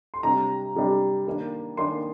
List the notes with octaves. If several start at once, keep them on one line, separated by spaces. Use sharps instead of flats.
C6
C3 G3 D4 A#5
C3 G3 D4
D#3 A#3 D4
D#3 A#3 D4 C6